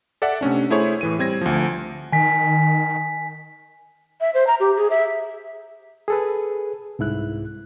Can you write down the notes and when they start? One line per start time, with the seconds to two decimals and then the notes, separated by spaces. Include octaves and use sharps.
0.22 A4 D5 E5 F#5
0.41 C3 A3 C#4 D4
0.70 A3 E4 G#4 C5 C#5
1.01 A2 E3 D#7
1.19 G3 C4 G#6 A#6
1.41 D2 F3
2.12 D#3 G#5 B6
4.21 E5
4.34 C5
4.47 A#5
4.60 G4
4.77 G#4
4.90 E5
6.08 G#4 A4 B4
6.99 C2 G#2 E4 F#6